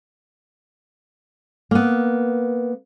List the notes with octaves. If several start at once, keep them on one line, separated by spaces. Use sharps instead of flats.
A#3 B3